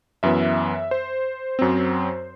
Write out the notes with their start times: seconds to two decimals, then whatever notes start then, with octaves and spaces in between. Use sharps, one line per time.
0.23 F#2 E3 B3 E5
0.91 C5
1.59 F#2 F#3 C4